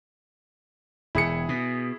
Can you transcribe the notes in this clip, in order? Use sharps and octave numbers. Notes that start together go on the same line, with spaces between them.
E1 E4 G#4 C#7
B2